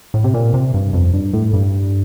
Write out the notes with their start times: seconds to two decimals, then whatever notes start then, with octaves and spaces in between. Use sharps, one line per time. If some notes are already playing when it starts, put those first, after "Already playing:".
0.14 A2
0.24 C3
0.34 A#2
0.54 C3
0.74 G2
0.93 F2
1.14 G2
1.33 A2
1.53 G2